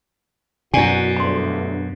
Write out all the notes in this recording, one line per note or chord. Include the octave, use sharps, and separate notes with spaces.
F#2 B2 E4 F#4 D5 G#5
D2 G2 A#5 C6